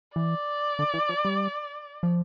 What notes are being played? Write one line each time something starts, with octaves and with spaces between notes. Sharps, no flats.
E3 D5
D3
E3
F3
G3
F3